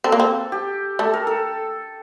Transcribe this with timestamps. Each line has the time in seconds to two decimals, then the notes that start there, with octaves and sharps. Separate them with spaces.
0.04 C4 A4
0.12 A#3
0.20 C4
0.52 G4
0.99 A3 A4
1.14 A#4
1.27 A4